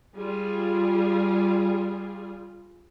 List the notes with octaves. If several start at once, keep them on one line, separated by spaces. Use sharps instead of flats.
G3 F4 G#4